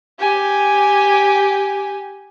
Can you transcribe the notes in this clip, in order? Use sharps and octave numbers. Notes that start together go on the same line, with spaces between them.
G4 G#5